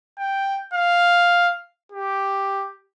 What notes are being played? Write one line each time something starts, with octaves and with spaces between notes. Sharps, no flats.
G5
F5
G4